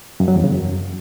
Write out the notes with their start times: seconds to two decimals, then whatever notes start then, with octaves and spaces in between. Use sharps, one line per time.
0.20 F#2
0.28 F#3
0.36 E2
0.44 C#3
0.52 F#2